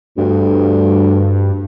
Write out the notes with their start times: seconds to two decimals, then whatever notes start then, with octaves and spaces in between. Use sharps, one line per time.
0.18 D2 G2